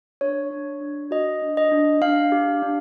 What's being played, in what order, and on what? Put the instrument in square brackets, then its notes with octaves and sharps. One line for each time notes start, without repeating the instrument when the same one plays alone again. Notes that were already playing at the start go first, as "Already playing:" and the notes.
[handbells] D4 C#5
D4
D4
F#4 D#5
D4
D#5
D4
D4 F5
G4
D4